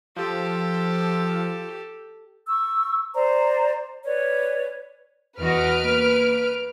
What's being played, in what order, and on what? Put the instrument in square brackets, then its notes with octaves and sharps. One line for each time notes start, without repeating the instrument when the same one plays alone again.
[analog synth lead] F3 [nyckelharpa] G4 A4
[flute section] C#6 E6
C5 D5 A#5
B4 C#5 D5
[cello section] E2 F#4 D#5 [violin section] B4 F6 D7
[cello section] A#3